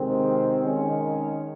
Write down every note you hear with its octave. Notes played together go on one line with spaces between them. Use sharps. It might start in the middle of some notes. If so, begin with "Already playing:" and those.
Already playing: C3 D#3 G#3 C4
D#3 G#3 C#4